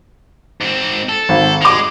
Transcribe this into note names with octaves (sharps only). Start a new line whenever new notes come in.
G#2 C4
A4
G#1
G#3 D6 F7